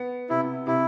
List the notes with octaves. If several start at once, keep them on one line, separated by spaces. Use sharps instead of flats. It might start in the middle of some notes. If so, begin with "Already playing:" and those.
Already playing: B3
C3 E4
C3 E4